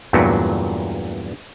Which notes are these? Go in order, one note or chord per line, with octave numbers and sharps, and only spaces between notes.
E2 G2 A#2 F#3 A3